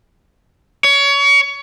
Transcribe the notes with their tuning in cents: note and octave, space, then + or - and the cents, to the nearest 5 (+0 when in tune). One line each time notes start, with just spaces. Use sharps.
C#5 +25